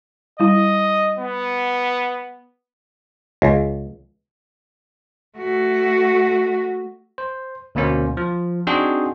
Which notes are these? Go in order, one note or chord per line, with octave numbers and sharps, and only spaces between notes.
G3 E4 D#5
B3
C#2
A3 F#4
C5
D2 B2 A#3 C#4 C5
F3
C4 D4 D#4 F#4 G#4 C5